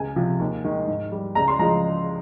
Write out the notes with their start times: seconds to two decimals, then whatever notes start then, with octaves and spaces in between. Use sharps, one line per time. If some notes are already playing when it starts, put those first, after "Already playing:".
Already playing: C#2 G#5
0.16 C3 F3
0.39 D#2
0.64 D#3 G#3
0.88 G#2
1.12 G3
1.35 C#2 A#5
1.48 C6
1.59 C#3 F3 G#3 A#5